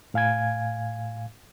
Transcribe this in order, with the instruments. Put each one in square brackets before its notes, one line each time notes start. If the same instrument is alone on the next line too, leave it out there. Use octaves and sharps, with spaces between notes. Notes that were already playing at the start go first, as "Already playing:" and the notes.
[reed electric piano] A2 F5 G#5 G#6